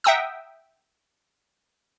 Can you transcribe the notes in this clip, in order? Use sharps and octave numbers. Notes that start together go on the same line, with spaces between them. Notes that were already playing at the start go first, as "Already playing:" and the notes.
E5 F#5 G5 A#5 D#6 E6